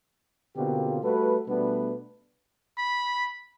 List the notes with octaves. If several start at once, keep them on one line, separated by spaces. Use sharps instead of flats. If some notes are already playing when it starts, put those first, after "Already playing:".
B2 D3 A#3 C4 F4 G4
G3 A3 F#4 A4 B4
B2 G3 A3 B3 D4 B4
B5